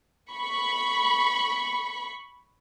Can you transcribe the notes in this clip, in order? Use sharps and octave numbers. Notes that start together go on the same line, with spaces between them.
B5 C#6